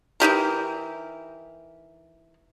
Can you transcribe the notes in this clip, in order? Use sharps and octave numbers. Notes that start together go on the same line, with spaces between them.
E3 D#4 G4 A#4